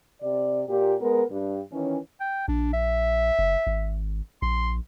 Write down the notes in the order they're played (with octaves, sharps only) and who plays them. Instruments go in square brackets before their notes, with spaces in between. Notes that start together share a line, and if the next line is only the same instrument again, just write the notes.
[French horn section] C3 D5
A#2 G4
G#3 B3 A#4
G2
D#3 E3 C#4
[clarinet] G5
[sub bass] A#1 [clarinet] D4
[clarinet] E5
[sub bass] F#1
G#1
[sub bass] A#1 [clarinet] C6